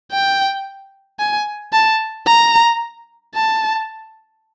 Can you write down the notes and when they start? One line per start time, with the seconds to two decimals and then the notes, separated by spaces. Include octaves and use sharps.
0.12 G5
1.20 G#5
1.73 A5
2.26 A#5
3.35 A5